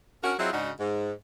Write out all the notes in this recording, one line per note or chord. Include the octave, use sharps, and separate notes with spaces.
C#4 D4 F#4 A#4
F#3 C4 E4 F4 G#4 D#5
G#2 C#3 D4 D#4 F#4
G#2